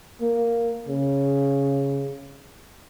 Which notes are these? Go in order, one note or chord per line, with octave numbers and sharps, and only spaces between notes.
A#3
C#3